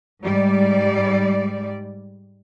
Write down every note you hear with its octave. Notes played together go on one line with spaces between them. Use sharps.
G#2 G3 D5